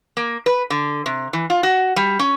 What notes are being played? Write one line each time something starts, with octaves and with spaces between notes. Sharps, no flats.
A#3
B4
D3
C3
E3
F4
F#4
G3
C#4